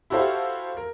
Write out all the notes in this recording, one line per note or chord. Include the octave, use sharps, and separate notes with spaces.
E4 F#4 G4 A4 C5 F5
A#4